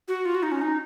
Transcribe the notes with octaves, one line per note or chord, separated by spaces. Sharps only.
F#4
F4
F#4
D#4
C#4
D#4